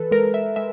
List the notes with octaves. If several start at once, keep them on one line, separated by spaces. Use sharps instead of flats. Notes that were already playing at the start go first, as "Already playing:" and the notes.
Already playing: E3 A4 B4
G#3 A#4
E5
G#3 E5